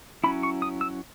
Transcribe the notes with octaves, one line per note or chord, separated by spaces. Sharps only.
F#3 C#4 E4 B5
C#6
D#6
E6